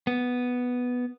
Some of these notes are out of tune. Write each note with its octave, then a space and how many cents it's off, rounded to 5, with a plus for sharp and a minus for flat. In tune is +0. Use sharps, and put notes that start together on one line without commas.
B3 +0